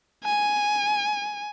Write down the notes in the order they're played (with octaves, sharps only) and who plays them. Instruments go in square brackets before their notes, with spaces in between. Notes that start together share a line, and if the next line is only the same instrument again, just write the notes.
[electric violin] G#5